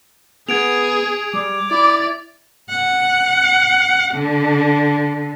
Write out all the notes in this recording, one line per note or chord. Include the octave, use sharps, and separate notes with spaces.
B3 G#4 G#6 D7 F7
G3 D6
E4 D5
F#5
D3